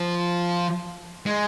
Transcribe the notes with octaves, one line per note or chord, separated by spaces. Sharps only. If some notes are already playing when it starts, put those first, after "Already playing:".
Already playing: F3
G#3